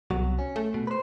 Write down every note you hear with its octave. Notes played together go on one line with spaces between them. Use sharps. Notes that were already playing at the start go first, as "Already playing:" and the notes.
C2 B2 F#3 F#4
C#4
A3
B2
B4 C5